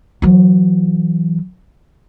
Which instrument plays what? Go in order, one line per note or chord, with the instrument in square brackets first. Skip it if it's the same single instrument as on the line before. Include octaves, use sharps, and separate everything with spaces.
[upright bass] E3 F#3